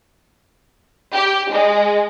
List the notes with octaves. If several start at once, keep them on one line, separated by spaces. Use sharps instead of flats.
G4
G#3